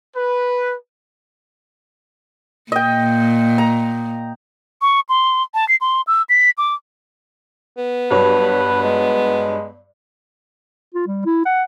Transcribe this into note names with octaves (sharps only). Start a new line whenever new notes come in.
B4
A#2 D#5 G5
A#5
C#6
C6
A5
C7
C6
E6
B6
D6
B3
G2 F#3 B4 C#5
G#3
F4
G3
E4
F#5